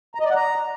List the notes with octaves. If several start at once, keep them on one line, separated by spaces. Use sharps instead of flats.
A#5
D#5
D5
F#5
A#5